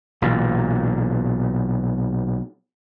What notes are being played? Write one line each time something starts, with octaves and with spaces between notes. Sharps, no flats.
B1 A#2 E3